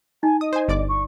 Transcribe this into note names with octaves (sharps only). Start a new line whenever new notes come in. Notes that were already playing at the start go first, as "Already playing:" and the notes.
D#4 G#5
D#5 D#6
C5 G#5
G1 D5 D6
C#6